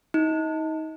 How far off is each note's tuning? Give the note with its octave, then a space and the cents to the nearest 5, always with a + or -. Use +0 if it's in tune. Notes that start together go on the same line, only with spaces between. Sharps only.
D#4 +30